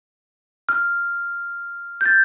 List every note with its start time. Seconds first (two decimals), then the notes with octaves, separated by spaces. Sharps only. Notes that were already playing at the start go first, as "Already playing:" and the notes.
0.69 F6
2.01 G6
2.06 A6